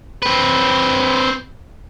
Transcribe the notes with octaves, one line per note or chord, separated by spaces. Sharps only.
C4 B4